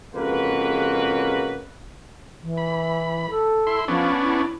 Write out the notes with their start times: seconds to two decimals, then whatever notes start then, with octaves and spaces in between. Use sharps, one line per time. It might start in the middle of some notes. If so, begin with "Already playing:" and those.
0.15 F2 C#3 G#3 A#3 F#4 B4
2.42 E3
2.57 B5
3.30 A4
3.67 E4 C6
3.88 F3 B3 C#4 D4
4.22 E4